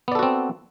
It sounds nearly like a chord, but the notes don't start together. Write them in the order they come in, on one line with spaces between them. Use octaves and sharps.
B3 D5 A4 F#4 C4